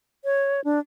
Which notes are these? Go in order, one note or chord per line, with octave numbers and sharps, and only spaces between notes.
C#5
D4